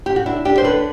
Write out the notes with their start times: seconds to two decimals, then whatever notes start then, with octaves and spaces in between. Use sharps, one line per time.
0.06 G4
0.16 F#4
0.26 D4 E4
0.45 D4 G4
0.58 C5
0.64 D3 B4